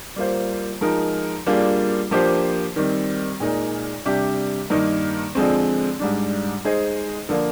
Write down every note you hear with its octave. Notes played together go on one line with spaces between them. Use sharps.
G3 A#3 F4 C5
F3 G#3 D#4 A#4
G3 A#3 D4 F4 G#4
F3 A#3 D4 G4 C5
D#3 G3 C4
A#2 G#3 D#4 A#4
C3 G3 D4 G4
G2 D#3 A#3 D#4 A#4
D3 F3 G#3 C4
G#2 G3 D4
G#3 D#4 G#4 C5 D#5
D3 F3 A#3 F4